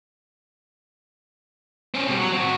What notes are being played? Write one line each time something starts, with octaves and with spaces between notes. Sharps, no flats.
C4 C#4
B2 G3
F#3
C4 F#4